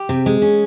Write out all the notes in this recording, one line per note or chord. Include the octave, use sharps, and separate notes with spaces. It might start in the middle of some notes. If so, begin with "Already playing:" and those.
Already playing: G4
C3
G#3
C#4